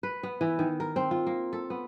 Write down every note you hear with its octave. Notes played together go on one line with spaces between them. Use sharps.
B4
B3
E3
D#3
A#4
C4
F4
A#3
A4
B3